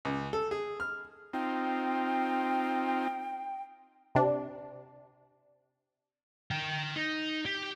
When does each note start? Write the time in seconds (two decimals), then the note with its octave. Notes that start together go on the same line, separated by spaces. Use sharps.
0.05 C#2
0.33 A4
0.51 G#4
0.80 F6
1.33 C4 D#4 F4 G5
4.15 C3 D4
6.51 A#4 G5
6.96 D#4
7.45 G4